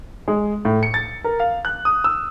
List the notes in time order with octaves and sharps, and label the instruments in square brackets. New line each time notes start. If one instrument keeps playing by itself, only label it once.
[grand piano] G#3
A2
C#7
A6
A#4
F5
F#6
D#6
E6